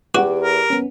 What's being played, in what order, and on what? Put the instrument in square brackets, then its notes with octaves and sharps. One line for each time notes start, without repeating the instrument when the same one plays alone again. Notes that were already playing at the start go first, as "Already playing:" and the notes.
[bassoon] E2 [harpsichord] F#4 [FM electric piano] G4 D6
[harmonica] A#4
[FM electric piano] B3 C#4